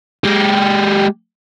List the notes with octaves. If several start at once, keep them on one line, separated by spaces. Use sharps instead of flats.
G#3 G4